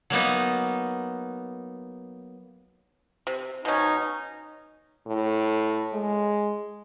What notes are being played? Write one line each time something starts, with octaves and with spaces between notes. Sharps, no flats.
F#3 A#3 B3 D#4
C3
B2 C#4 D#4
A2
G#3